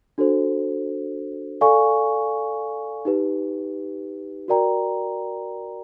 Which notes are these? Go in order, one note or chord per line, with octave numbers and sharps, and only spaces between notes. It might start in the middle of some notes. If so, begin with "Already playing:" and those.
D4 F#4 A4 C5
A4 D5 F5 G#5 C#6
D#4 G4 B4
F#4 A#4 D5 G5 A#5